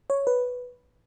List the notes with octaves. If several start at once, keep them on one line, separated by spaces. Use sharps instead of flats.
C#5
B4